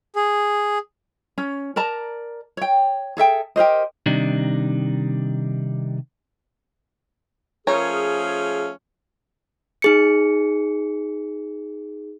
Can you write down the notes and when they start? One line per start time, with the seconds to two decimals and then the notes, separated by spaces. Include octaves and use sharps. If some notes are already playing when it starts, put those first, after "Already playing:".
0.16 G#4
1.38 C#4
1.76 A#4 D5 A5 A#5
2.57 C#5 G5
3.17 G#4 A4 E5 G5
3.56 G4 A#4 C5 D#5
4.06 C3 D#3 G3 D4 D#4
7.67 F3 A3 C#4 G#4 A#4 C#5
9.82 D#4 G#4 C#7